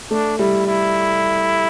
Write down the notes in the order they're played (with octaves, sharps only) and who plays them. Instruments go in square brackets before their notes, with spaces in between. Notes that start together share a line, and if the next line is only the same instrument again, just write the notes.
[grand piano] A3 [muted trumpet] D4
[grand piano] G3 [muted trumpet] E4
[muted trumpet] E4